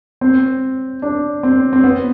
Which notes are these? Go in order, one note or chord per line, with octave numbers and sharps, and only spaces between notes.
C4
D4
C4
C4
B3